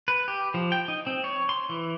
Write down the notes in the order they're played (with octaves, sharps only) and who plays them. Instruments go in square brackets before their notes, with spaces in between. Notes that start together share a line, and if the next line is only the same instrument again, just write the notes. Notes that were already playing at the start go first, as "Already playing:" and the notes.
[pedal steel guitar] B4
G4
F3
G5
D#4
C4
C#5
C6
E3